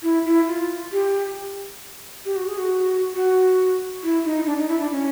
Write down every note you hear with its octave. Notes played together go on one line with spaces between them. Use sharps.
E4
E4
F4
G4
G4
F#4
G#4
F#4
F#4
E4
D#4
D4
D#4
E4
D4
C#4